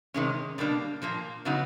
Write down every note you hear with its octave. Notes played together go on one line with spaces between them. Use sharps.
C3 D#3 G#3 C#4
B2 G3 A#3 D4
A#2 F3 A#3
C#3 F#3 B3 D#4 F#4